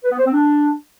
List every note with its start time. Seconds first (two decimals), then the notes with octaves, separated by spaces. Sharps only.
0.04 B4
0.11 B3
0.18 C5
0.26 C4
0.33 D4